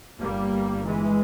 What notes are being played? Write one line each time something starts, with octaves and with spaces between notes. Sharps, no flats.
G1 G2 G3 A#3
E3 G#3